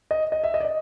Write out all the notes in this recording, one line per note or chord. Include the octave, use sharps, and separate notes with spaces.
D#5
D#5
E5
D#5
D5
D#5